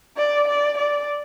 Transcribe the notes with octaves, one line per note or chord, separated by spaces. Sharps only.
D5
D5
D5